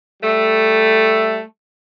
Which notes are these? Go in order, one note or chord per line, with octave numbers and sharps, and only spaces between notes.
G3 A3